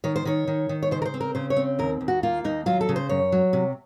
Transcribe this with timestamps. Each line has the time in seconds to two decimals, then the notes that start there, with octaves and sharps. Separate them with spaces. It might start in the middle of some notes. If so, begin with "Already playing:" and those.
0.04 D#3 C#5
0.16 C5
0.25 D#3 C#5
0.47 D#3
0.69 D#3
0.83 C#5
0.91 C#3 C5
1.02 A#4
1.05 C5
1.14 C4
1.21 A#4
1.35 C#3 C5
1.50 C#5
1.56 C4
1.79 D#2 A#4
2.01 D#2
2.08 F#4
2.23 A#3 F4
2.44 D#2 D#4
2.66 F#3 F4
2.81 A4
2.89 C#3
2.96 C5
3.09 F#2 C#5
3.32 F#3
3.53 C3